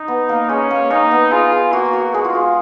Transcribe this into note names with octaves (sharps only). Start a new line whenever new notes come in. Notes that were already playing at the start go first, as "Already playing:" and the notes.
Already playing: D#4
B3
A#3
G#3 C#4
A#3
A#3 D#4
B3
F4 G#4
G#4
A#3 F#4
F#4
G#3 G#4
F4
F4